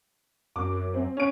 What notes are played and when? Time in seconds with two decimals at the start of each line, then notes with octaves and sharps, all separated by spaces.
0.56 F#2 D6
0.94 C4
1.17 C#4 D7